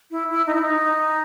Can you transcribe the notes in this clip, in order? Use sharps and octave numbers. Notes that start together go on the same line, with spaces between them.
E4
E4
D#4
E4
D#4